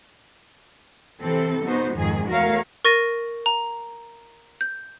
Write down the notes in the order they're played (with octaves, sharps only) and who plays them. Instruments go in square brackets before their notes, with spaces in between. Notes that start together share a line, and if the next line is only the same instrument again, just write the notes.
[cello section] C3 E3 C4 A4
B3 D#4 F#4 C5
F2 G#2 D#3 G#4
E2 A3 F#4 A#4 C#5 F5
[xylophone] A#4 C#6 A6 A#6 D#7
A#5
G6